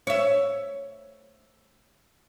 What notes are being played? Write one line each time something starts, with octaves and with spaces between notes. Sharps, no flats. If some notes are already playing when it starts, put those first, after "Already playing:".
C#5 E5